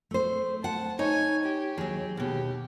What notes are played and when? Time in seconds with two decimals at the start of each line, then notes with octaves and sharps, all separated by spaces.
0.11 A3 C5
0.64 F#5 A5
0.99 D#4 C#5 G#5
1.44 G4
1.78 D#2 F#3 G#4
2.17 D#2 B2 G4